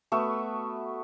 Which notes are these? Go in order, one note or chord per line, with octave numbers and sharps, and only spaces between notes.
A3 B3 F#4 E5